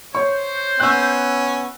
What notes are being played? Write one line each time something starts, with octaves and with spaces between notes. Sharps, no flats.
C5 C#5 C#6
B3 C#4 E6 F#6